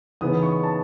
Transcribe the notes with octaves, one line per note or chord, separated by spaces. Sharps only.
C#3 E3 B3 D#4 D#6
C#6
A5